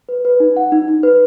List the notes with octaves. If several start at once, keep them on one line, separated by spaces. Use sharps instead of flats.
B4
B4
D#4
F#5
D#4
D#4
B4